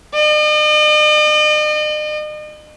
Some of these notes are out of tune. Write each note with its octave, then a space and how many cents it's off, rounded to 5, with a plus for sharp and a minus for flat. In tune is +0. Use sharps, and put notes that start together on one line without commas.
D#5 -45